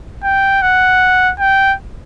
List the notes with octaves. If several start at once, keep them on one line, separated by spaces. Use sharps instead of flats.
G5
F#5
G5